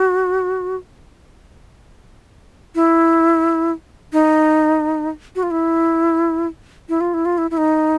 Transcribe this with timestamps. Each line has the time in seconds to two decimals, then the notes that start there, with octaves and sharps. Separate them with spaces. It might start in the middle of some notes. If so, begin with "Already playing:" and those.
Already playing: F#4
2.75 E4
4.13 D#4
5.36 F#4
5.43 F4
5.51 E4
6.89 E4
7.00 F4
7.14 E4
7.25 F4
7.38 E4
7.51 E4
7.57 D#4